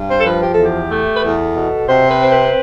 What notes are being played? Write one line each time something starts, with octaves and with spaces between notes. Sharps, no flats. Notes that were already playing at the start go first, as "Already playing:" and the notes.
Already playing: G2
C5
A4
F3 B4
G4
E2 A4
G4
A3
B4
E2 A4
B2
C3 C5
B4
C4
B4